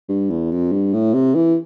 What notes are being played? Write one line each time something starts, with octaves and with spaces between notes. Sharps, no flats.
G2
E2
F2
G2
A2
C3
E3